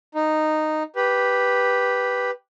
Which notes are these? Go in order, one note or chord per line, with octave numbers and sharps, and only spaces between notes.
D#4
G4 B4